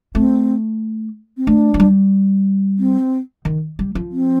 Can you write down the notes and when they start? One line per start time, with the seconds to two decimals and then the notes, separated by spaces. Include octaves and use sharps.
0.15 A3 C4
1.37 C4
1.47 A3 D4
1.74 F3
1.80 G3
2.79 C4
3.45 D#3
3.79 G3
3.95 F3
4.12 C4